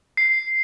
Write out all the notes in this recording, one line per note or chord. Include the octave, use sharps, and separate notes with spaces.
C7